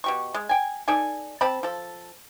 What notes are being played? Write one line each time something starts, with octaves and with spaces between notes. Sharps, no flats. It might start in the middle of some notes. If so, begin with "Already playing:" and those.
B2 G4 C#6
G#3
G5 G#5
D#4 A4 D5 G#5
C4 A5 B5
F3 A4